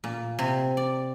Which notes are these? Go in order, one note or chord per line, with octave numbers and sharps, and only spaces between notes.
A#2
C3
D5